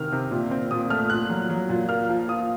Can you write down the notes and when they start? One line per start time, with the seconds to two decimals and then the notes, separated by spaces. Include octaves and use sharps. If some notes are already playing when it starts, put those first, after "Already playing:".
Already playing: C3 D#3 F6
0.12 C3
0.31 A#2
0.51 C4
0.71 A#2 D#6
0.90 A3 F6
1.10 A#2 F#6
1.30 F#3
1.50 F#3
1.69 A#2
1.89 A#3 F6
2.09 F3
2.28 F4 D#6